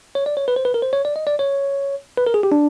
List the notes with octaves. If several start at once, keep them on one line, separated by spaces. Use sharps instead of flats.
C#5
D5
C#5
B4
C5
B4
A#4
C5
C#5
D5
D#5
D5
C#5
B4
A#4
G#4
G4
D4